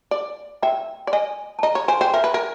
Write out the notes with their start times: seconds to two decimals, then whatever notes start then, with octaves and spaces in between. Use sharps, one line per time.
0.11 D5
0.63 E5 G5
1.07 D5
1.13 D#5 G#5
1.59 A5
1.63 D#5 A#5
1.75 C#5
1.88 C5 G#5
2.01 C5 G5
2.13 A#4 E5
2.24 B4
2.34 A#4